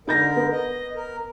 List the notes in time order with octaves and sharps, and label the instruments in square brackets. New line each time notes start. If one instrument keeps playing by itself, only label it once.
[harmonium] D3 A#4 [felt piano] D#4 G6 A#6
[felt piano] B3
[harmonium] D#5
A#4